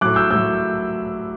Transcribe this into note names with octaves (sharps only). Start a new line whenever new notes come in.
A2 F#3 D6 F#6
E6 G6
A2 F#3 E6 G6